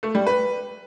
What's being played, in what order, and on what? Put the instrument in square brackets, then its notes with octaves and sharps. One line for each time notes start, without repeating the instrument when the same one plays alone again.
[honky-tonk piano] A3
G3
B4